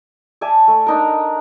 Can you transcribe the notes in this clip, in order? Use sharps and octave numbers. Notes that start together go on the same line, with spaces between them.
D5 E5 G#5 A5
A3
D4 D#4 A#4